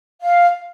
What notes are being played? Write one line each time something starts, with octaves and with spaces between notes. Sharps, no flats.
F5